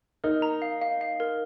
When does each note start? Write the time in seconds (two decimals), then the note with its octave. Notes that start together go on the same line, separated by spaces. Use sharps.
0.24 D#4 A#4
0.42 A#5
0.62 F5
0.82 F5
1.01 F5
1.20 A#4